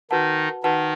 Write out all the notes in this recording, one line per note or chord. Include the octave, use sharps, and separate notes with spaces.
D#3 D#4 F#4 B4 F#5 A5
D#3 D#4 F#4 B4 F#5 A5